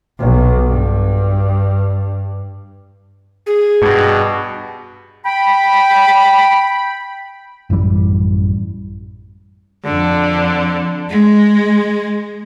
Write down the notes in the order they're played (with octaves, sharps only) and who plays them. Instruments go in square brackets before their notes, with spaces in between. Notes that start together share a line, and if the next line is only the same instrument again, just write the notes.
[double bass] B1
G2
[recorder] G#4
[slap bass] G2 [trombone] B2
[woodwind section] G5 B5
[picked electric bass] A1 F#2 E3 G3
[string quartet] F2 D3
G#3